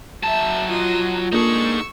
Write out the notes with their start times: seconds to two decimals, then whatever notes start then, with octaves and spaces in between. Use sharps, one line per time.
0.23 F#3 E5 A5
0.69 F4 D#5 C6
1.32 A#3 D4 D#4 G#4 A4 C#6 E6